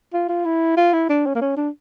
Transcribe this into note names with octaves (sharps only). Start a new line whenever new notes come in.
F4
F4
E4
F4
E4
D4
C#4
A#3
C#4
D4